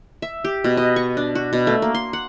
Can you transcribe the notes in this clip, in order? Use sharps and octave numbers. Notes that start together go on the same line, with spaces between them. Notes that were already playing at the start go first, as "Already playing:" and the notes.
E5
G4
B2
D#5
C#6
D4
F#4
B2
A3
A#3
C6
F#5